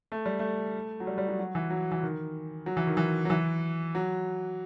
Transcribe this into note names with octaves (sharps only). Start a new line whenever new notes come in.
A3
G3
A3
F#3
G3
G3
F#3
F#3
E3
F#3
E3
D#3
F#3
E3
D#3
E3
F#3
E3
F#3